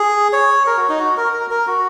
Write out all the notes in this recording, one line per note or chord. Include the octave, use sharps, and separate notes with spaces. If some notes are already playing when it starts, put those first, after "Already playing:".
Already playing: G#4
C#5
A#4
F#4
D#4
F#4
A#4
A#4
A#4
F#4